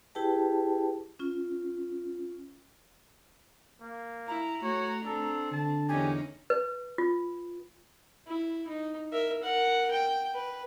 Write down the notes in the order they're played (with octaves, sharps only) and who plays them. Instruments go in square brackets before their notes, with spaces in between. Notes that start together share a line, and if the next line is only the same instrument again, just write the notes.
[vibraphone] E4 G4 G#4 B4 G5 A5
C#4 F4
[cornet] A#3
[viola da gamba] E4 [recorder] A#5
[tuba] A3 [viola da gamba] F#4 [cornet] C#5
[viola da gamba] C4 D4 [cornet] A4
[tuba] D3 [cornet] A5
[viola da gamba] E2 C#4 D#4 [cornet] G4 [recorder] G#5
[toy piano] B4
F4
[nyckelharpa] E4
D#4
A#4 E5
A#4 F#5
G5
B4